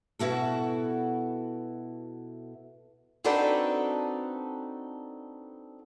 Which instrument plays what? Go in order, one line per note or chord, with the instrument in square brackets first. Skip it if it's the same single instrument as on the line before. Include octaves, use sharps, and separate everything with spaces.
[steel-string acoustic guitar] B2 E4 F#4 A4
C4 D4 D#4 F#4 A4 B4